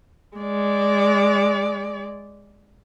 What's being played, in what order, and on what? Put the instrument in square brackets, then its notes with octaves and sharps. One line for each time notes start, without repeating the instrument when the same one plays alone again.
[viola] G#3 D5